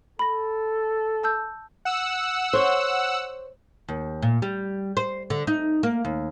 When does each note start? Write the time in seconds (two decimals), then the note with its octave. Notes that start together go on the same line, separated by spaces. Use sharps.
0.19 A4 B5 A#6
1.23 A5 E6 G6
1.85 F#5 E6
2.53 C5 C#5
3.88 D#2
4.22 A#2
4.42 G3
4.97 C5
5.30 D3
5.47 D#4
5.83 A#3
6.05 D#2